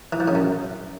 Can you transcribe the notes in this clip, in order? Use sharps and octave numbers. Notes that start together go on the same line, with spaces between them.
E3
F3
C#3
F#2